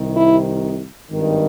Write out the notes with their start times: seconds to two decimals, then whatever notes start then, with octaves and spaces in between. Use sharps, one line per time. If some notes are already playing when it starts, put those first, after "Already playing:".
Already playing: C2 C3 D#3
0.16 E4
1.09 G#1 G2 D#3